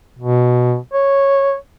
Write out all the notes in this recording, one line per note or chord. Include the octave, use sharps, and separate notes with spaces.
B2
C#5